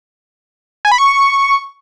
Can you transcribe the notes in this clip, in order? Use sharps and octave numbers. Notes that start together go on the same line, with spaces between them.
G#5
B5
C#6